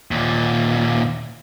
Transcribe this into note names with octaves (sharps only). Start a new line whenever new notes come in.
D#2 A#2